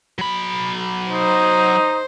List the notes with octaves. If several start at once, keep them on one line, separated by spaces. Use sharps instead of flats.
F#3 B5
D#4 C5